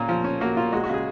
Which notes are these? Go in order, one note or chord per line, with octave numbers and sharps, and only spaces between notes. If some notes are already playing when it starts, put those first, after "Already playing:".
Already playing: A#2 A#3 C#4 A#4
F3
C#4
A#3 F#4
A#2 F4
G#3 F#4
F#4
C#3 G#4